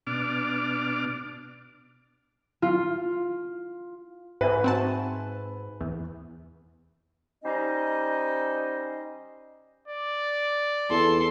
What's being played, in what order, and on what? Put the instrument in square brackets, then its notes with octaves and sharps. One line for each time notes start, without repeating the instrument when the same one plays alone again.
[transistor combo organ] B2 D4 D6 F6
[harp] F4
[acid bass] G#2 [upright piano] B4 E5 G#5
[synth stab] C4 F#4 A5
E2
[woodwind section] G3 C#4 D#4 C5 D#5
[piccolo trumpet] D5
[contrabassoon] E2 [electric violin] A4 C6